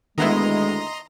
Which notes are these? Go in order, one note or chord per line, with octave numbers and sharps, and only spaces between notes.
D2 D#3 G#3 B3 E4 D#5 A#5 C6